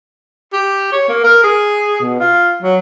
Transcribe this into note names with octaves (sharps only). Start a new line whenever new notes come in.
G4
C#5
A#3
A#4
G#4
B2
F4
F#3